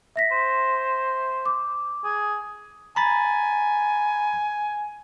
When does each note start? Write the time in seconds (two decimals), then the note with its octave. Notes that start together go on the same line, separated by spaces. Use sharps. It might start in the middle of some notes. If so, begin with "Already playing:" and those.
0.16 E5 A#6 B6
0.31 C5
1.46 D6
2.04 G#4
2.96 G#5 A#5 B5 A6